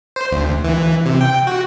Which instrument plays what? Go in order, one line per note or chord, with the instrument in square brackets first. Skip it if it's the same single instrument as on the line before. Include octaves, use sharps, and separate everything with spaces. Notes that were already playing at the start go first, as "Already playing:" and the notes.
[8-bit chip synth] C5
D2
E3
C3
G5
F#4